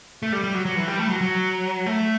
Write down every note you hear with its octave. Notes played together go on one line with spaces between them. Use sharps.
A3
G3
G3
F#3
F#3
E3
G3
A3
F#3
F#3
A3